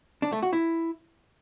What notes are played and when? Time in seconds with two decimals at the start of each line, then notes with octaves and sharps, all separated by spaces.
0.22 D4
0.32 A3
0.43 F#4
0.53 E4